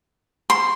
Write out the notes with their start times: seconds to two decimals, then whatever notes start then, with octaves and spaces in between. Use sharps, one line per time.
0.50 C6